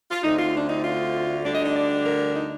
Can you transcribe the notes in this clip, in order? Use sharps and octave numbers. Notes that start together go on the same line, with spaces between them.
F4
D2 D3 A3 C4 D#4
F4
D4
D#4
F4
D2 D3 G3 D4 D5
D#5
D#5
D5
A#4
D#4